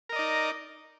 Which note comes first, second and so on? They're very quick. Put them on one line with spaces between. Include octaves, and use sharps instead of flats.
A#4 D#5 D5 D#4